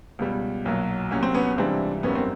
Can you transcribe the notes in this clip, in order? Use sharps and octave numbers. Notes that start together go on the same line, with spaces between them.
C#2 B2 G3
B1 A#2 F#3
C2 A#2 F#3 C#4
C4
B3 C#4
C#2 C3 E3 G3 C4 D4
G#1 F#2 D#3 G3 B3 C#4
C4